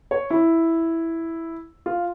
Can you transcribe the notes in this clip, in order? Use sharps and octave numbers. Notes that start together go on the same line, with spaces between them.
C#5
E4
F4